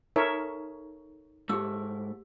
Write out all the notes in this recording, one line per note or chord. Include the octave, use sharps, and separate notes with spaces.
D#4 A4 A#4 C#5 E5
G#2 A3 G4 G#4 E6